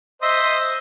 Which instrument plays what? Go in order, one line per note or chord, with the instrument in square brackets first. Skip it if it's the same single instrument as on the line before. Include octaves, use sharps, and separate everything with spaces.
[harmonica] C5 D#5 C6 [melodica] E5 D#6